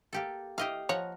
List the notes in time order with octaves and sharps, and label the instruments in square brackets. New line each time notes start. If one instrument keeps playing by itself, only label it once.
[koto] A#3 G4 A4
[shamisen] E3 [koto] G4 D#5 F5
[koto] F3 F#5 A#5 [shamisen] C#5